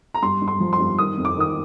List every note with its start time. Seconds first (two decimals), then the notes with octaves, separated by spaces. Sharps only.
0.14 A#5
0.22 G2 C6
0.42 G2
0.48 C6
0.60 F3
0.73 C6
0.80 G2
0.98 D#3 D#6
1.17 F2
1.25 D6
1.37 D#3 D#6